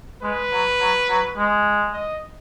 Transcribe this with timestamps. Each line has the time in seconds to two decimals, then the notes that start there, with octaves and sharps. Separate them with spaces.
0.22 G#3 B4
0.52 F#3
0.80 F#3
1.09 F#3
1.37 G#3
1.94 D#5